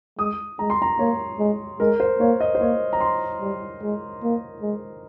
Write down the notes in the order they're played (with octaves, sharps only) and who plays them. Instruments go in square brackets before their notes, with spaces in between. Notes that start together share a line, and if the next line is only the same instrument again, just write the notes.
[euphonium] G#3 [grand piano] D#6
[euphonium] G#3 [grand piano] A#5
[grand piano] C6
A#5
[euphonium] A#3 [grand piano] C#5
[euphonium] G#3
[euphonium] G#3 [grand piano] A#4
[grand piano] C5
[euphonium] A#3 [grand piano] C#5
[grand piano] D#5
C5
[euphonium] A#3 [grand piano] C#5
[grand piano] A#5
C6
[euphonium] G3
G#3
A#3
G#3